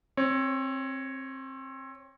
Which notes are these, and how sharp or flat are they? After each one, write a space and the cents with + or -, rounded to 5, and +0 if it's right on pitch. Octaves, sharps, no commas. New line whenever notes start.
C4 +25 C#5 +0